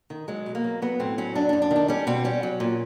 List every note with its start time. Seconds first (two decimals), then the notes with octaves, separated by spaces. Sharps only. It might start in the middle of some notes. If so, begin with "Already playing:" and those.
0.10 D#3
0.28 F#3 G#3
0.46 B2
0.55 A#3
0.64 F#3
0.82 F#3 B3
1.00 A2 C4
1.18 F#3 C#4
1.35 F#2 D4
1.49 D4
1.53 F#2
1.62 D4
1.71 D#3
1.76 D4
1.88 G3 C#4
2.07 B2 C4
2.25 G3 C#4
2.43 F#3
2.60 A#2